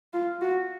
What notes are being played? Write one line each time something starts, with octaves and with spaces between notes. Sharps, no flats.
F4
F#4